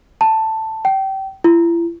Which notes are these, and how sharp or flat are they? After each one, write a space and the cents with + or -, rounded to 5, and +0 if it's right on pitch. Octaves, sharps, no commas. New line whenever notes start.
A5 +10
G5 -25
E4 +40